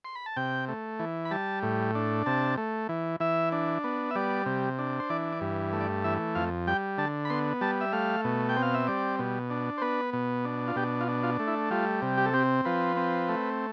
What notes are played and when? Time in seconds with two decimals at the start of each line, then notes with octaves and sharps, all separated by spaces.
0.05 C6
0.15 B5
0.26 A5
0.36 C3 G5
0.68 A3
0.99 E3
1.25 B5
1.31 G3 A5
1.63 A2
1.95 D4
2.26 C3 A5
2.57 A3
2.89 E3
3.20 E3 E5
3.52 D4
3.84 B3
4.11 E5
4.15 G3 D5
4.46 C3
4.79 D4
5.00 C5
5.10 E3 D5
5.33 D5
5.41 G2
5.73 A3
5.80 D5
6.04 E3 E5
6.35 F2 F5
6.67 G3 G5
6.98 D3 A5
7.25 B5
7.30 B3 C6
7.61 G3 A5
7.81 E5
7.93 A3 F5
8.24 B2
8.49 G5
8.56 C4
8.62 F5
8.74 E5
8.87 G3 D5
9.19 B2
9.50 D4
9.78 C5
9.81 B3 B4
10.13 B2
10.45 D4
10.68 F4
10.76 B2 G4
11.01 F4
11.08 D4
11.23 F4
11.39 A3
11.48 E4
11.71 G3 F4
12.02 C3
12.17 G4
12.25 A4
12.34 C4 G4
12.65 F3 B4
12.97 C4
13.29 A3